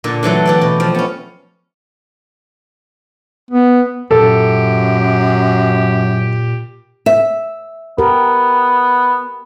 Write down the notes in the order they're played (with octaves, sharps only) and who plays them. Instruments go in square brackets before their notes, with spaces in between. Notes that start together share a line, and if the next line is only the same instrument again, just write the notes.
[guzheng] A#2 D3
D3 E3 F#3 A3
E3 G4 D5
B2
F3
B3 C#4
[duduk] B3
[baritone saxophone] F#2 [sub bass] A#2 [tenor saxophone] G4 [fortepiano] A4
[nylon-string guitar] E5
[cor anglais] B3 [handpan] G4 A#4